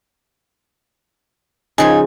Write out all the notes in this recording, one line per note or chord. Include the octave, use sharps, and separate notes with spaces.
C#3 F3 D#4 G#4 G#5